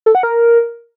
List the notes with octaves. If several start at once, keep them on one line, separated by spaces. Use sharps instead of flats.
A4
F#5
A#4